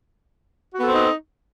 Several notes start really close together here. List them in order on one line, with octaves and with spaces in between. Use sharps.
F#4 B3 A4 C4 D#4